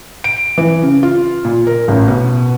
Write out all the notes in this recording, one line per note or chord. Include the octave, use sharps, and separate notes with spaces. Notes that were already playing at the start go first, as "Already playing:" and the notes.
D7
E3
C#3
F4
A#2
A#4
A1
B2